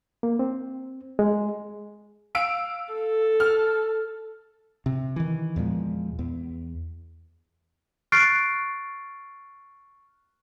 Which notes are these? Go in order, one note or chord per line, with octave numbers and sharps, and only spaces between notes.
A#3
C4
G#3
F5 E6 D7
A4
F6
C3
D#3 E3
E2 A#2 F3 G#3
E2
C#6 F6 F#6 A6 C7 D7